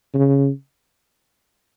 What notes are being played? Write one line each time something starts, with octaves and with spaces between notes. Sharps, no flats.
C#3